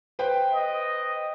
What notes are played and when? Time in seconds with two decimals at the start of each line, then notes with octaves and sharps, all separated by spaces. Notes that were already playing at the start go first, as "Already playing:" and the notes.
0.19 B4 C5 G5
0.51 D#5